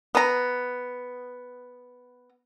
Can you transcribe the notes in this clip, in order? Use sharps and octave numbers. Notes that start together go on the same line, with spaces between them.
B3 A#5